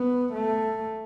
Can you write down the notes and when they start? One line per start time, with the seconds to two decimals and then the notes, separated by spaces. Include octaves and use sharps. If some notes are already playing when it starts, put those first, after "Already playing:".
Already playing: B3
0.33 A3